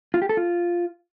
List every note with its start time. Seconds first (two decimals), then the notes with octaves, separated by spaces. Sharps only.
0.14 F4
0.22 G4
0.29 A4
0.37 F4